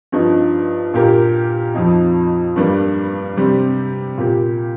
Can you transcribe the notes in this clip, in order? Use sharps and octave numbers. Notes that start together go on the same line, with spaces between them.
G2 F3 D#4
A#2 A#3 G4 A#4
F2 F3 D#4
G2 G3 A#3
C3 G3 C4 G4
A#2 A#3 G4